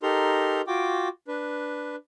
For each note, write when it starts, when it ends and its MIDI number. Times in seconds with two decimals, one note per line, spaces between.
0.03 0.61 63
0.03 0.61 67
0.03 0.61 69
0.03 0.61 70
0.03 0.61 82
0.03 0.61 84
0.67 1.08 65
0.67 1.08 66
0.67 1.08 79
0.67 1.08 86
1.28 1.96 62
1.28 1.96 71